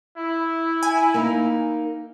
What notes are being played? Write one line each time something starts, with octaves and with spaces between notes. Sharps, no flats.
E4
G#5
A#3 D#4